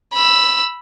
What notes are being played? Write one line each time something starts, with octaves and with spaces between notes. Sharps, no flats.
B5 E6